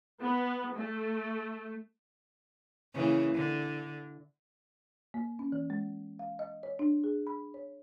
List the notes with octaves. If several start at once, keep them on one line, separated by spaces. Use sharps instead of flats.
B3
A3
C#3 E3 A#3
D3
A#3
C#4
E3
G#3
F5
D#5
C#5
D4
G#4
B5
C#5